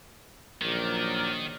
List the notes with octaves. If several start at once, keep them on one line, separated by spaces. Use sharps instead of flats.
A#1 D#3 F#3 A#4 D5